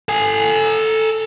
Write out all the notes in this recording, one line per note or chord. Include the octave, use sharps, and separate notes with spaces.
A4 G#5